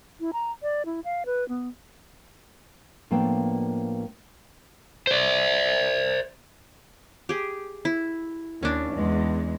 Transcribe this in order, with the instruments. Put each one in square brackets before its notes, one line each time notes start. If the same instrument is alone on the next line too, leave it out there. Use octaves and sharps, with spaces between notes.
[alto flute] E4
A#5
D5
E4
F5
B4
B3
[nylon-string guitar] A2 F3 A#3 B3 D4 G5
[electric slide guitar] C5 D5
[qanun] G4 G#4
E4
[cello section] D#2 [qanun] C#4 D4
[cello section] E2 G#3